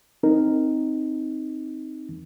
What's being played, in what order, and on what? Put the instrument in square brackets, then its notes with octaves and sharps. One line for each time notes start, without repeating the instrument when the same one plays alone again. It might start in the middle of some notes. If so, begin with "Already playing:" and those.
[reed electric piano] C4 D#4 A#4